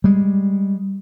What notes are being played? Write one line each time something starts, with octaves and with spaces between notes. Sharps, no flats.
G3 G#3